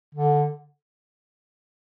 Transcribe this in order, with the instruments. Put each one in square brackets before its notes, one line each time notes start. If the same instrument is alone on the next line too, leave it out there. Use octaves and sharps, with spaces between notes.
[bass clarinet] D3